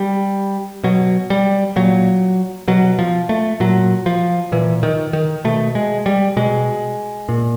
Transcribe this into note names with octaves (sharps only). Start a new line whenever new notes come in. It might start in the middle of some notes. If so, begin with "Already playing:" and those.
Already playing: G3
B2 F#3
G3
A#2 F#3
B2 F#3
F3
A3
A#2 F#3
F3
A#2 E3
D#3
D#3
B2 A3
G#3
G3
B2 G#3
A#2